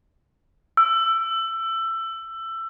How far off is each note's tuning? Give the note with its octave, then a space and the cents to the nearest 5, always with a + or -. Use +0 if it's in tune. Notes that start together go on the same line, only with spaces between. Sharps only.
E6 +20